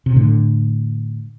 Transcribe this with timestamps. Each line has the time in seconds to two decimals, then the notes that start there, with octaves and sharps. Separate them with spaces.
0.06 C3
0.16 A2 D3